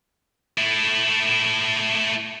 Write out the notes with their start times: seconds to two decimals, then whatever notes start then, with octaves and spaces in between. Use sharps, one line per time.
0.58 A3 E4